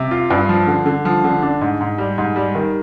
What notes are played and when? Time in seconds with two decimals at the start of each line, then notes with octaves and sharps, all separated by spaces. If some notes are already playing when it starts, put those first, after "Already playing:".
Already playing: C3
0.11 F4
0.30 G2
0.49 F3
0.67 D3
0.86 D3
1.05 F3
1.24 D3
1.42 D4
1.61 G#2
1.81 G#2
1.98 G3
2.18 G#2
2.36 G3
2.55 D#3